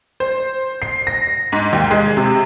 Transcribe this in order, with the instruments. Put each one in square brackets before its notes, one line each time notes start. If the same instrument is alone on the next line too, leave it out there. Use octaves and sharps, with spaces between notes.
[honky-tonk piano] C5
C7
A#6
G#2
D#2
G#3
C3